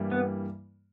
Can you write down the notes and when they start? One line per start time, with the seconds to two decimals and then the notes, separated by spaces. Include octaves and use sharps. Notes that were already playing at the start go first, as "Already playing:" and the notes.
Already playing: G2 E3 G3 A#3 E4
0.11 B3